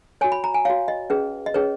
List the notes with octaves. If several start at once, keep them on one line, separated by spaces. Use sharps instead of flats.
F#4 C#5 G#5
B5
A#5
G#5
F#4 C#5 F5
D#5
C#4 G#4 B4
D#5
C#4 G#4 B4 C#5